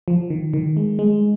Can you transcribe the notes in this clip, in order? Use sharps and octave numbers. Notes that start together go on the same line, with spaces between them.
F3
D#3
D#3
G#3
G#3